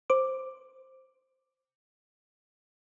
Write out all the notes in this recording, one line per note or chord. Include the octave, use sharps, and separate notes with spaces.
C5 D6